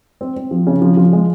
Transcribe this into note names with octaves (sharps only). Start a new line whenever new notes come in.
C4
C4
F3
C#3
F3
F3
G#3